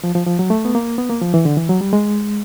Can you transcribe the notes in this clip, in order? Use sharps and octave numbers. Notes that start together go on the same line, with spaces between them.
F3
F3
F3
F#3
A3
B3
A#3
B3
A#3
F3
E3
D3
E3
F#3
G3
G#3